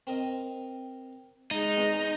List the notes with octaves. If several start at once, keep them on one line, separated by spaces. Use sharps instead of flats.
C4 A#4 D#5
G#3 D#4
E2